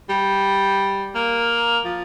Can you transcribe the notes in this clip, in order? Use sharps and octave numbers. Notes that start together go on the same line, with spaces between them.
G3
A#3
F3